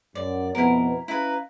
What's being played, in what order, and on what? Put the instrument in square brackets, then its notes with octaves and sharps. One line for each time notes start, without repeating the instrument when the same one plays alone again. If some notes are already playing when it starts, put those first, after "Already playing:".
[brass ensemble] F#2 [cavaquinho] D5
[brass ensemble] F2 B2 B3 [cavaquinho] E4 A#4
[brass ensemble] C#4 F5 A#5 [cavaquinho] E4 B4